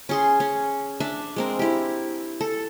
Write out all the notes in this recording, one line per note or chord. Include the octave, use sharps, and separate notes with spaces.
C#4 G#4 C6
C#4
D4 E5
G#3 C4 A#4
E4 G4
A4